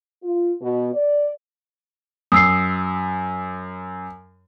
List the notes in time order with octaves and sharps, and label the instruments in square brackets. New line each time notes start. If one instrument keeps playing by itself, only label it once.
[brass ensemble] F4
B2
D5
[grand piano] F#2 [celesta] D#6 E6 C7